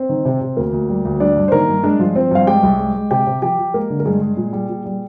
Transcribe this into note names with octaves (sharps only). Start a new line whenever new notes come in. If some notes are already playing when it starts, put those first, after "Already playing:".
Already playing: C4 C5
D#3
C3
C3
D2 A#3 A#4
D2
G3
D2
G3 D4 D5
G2
C5
D#3 A#3 A#4
G2
G#3 D4 D5
G2 F3 F4
F3 C4 C5
G2 F5
G#3 G4 G5
C2
G#3
G#3
C3 G4 G5
C3
F3 G4 G5
F3
G#3 A#3 A#4
D3
A#4
G2 G#3 G#4
G#3
A#2
G3
A#2
G3